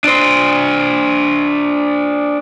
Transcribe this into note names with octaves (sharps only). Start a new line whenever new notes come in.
D4 C5